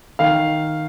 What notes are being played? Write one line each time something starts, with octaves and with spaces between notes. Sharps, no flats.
D#3 F5